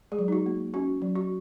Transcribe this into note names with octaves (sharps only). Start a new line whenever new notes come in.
G#3 G#4
F#3
D#4
F#4
A#3
C#4 F#4
F#3
F#4